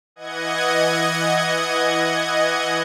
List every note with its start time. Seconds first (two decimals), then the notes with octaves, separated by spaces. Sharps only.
0.16 E3 D#5 F#5 G#6